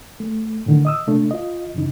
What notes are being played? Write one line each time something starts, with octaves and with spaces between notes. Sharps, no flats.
A3
A2 D3 D#3
D#5 D#6 E6
C3 A3 D4
F4 D#5
F#2 C#3 E3 D#4